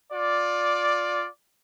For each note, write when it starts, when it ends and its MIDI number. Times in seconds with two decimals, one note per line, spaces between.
0.13 1.29 65
0.13 1.29 74